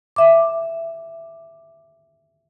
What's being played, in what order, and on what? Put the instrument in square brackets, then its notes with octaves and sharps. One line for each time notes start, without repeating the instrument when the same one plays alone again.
[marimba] E5 D6